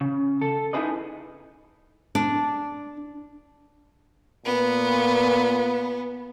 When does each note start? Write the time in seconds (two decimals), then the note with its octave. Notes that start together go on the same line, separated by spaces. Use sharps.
0.01 C#3
0.41 A4
0.73 D#4 E4 G#4 B4 D#5
2.15 D4
4.46 A#2 B3